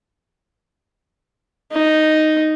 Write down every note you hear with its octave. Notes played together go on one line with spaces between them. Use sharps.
D#4